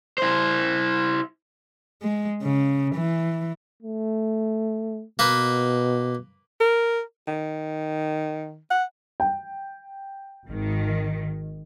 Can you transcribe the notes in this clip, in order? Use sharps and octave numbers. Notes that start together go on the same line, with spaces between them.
E4 C5
G#3
C#3
E3
A3
B2 A#3 B4
A#4
D#3
F#5
G5
G#1 D#3